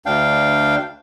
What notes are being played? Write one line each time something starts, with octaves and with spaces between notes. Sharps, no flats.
D2 D4 F5 G5